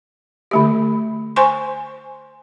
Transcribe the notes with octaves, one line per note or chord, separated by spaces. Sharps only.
D3 A3 G4
C5 G#5 C6 C#6